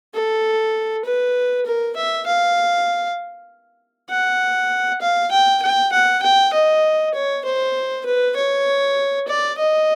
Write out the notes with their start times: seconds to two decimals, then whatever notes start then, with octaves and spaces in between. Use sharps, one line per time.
0.14 A4
1.05 B4
1.66 A#4
1.96 E5
2.27 F5
4.10 F#5
5.01 F5
5.31 G5
5.62 G5
5.92 F#5
6.22 G5
6.53 D#5
7.14 C#5
7.45 C5
8.06 B4
8.36 C#5
9.28 D5
9.58 D#5